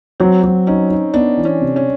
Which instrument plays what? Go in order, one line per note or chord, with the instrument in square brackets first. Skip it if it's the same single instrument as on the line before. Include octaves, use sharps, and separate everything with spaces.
[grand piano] F#3 [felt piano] C4
[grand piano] F#3
[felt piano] C#4 [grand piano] D#4
[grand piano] D#4
[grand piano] B3 [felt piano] D4
[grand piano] E3
[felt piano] C#4
[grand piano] C3
[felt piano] C#4